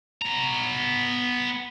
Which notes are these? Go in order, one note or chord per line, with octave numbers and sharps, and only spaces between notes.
B3 A#5